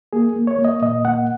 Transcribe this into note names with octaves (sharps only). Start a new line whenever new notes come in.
A#3 G#4
A#3
C#5
A#3
D#5
A#2 D#5
A#3 F#5